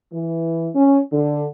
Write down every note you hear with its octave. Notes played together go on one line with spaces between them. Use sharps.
E3
C#4
D3